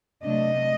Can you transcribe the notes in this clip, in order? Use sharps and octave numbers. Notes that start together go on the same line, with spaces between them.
C3 F#3 A3 D4 D#5